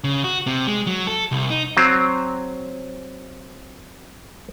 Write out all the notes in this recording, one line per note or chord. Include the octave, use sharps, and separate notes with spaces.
C#3
F#4
C3
G#3
F#3
A4
C2
D#4
F#3 C4